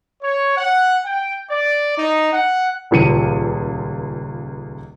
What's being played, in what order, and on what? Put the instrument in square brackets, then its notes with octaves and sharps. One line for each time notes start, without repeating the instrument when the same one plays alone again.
[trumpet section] C#5
F#5
G5
D5
D#4
F#5
[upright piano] D#1 C#2 F3 C#7 D#7